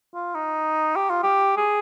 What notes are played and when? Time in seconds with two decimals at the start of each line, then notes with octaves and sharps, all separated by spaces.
0.14 F4
0.34 D#4
0.96 G4
1.10 F4
1.23 G4
1.57 G#4